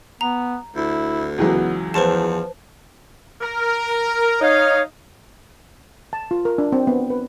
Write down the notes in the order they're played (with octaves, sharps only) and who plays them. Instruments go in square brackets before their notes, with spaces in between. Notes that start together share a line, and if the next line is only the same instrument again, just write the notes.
[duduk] B3 [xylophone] A#5
[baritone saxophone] D2 [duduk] E4
[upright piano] C#2 E3 F#3 [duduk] B3
[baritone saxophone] E2 [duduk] F3 [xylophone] B4 C5 A5
[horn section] A#4
[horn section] D#4 F5 [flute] C#5
[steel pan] A5
F4
A#4
D4
C4
B3
B4